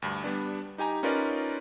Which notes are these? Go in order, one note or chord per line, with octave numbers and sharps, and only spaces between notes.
D2 G2
G3 B3 D4
D#4 G4 G#5 A#5
C#4 D#4 F4 A#4 B4 D5